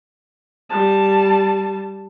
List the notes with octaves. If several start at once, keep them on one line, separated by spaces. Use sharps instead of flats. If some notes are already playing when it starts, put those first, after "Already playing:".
G3 A5